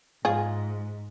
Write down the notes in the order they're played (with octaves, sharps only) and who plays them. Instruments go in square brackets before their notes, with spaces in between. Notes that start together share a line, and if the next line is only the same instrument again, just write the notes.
[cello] G#2 [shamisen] F4 G#4